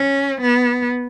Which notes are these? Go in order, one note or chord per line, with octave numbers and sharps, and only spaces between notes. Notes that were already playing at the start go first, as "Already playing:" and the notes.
Already playing: C#4
B3